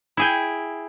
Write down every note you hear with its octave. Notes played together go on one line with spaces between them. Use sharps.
E4 G#4 G5